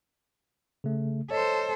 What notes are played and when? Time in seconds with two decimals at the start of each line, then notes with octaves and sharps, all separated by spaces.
0.84 C#3 A3
1.31 A4 C5 C#5 D#5